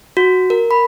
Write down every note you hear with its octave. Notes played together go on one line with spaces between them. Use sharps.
F#4
A#4
B5